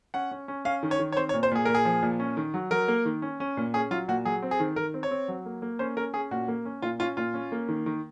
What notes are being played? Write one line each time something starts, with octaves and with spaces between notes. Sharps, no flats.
C#4 F#5
C#4
C#4
C#4 F5
D#3
C#5
D#3
C#5
C4 C5
C#5
A#2
C5
A#2 G#4
A#2 A#4
G#4
F3
A#2
C#4
D#3
F#3
F#3 A#4
A#3
D#3
C#4
C#4
A#2
C#4 G#4
F#3 F4
A#2 F#4
F#3 G#4
C4
G#4
D#3
D#3 A#4
C4
C#5
C4
F#3
A#3
A#3
C#4 C5
C#4 A#4
C#4 G#4
A#2 F#4
A#3
C#4
A#2 F4
C#4 F4
A#2 F4
C#4
A#3
D#3
D#3